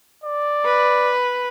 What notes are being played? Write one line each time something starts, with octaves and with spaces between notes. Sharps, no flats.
D5
B4